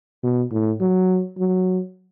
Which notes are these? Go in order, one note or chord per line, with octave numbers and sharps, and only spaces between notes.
B2
A2
F#3
F#3